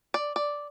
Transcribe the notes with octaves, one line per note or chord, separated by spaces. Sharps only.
D5
D5